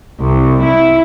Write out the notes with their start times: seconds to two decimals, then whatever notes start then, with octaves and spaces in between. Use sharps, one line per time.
0.20 C2
0.62 E4